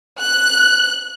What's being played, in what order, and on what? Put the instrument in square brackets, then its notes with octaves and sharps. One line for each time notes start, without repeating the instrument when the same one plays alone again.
[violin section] F#6